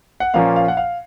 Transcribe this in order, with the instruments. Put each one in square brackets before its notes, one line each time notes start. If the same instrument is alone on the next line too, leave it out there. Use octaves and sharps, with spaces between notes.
[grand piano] F#5
A#2 F3 A#3 C#4 F5
F5
F#5
F5